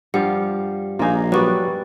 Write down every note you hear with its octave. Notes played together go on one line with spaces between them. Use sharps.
G2 F3 G3 F5 F#5
A#1 A#3 D#4 F4 G#5
F#3 G3 B3 B4 D5 C#6